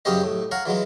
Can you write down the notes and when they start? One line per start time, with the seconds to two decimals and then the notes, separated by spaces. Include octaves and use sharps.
0.05 F#2 C#3 C#4 G4 C5 D#5
0.24 A2
0.51 C#5 F5 F#5 A#5
0.65 E3 F#3 G#3 F4